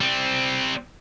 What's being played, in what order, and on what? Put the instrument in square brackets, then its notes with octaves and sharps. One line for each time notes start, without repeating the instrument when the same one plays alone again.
[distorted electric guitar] G3 C4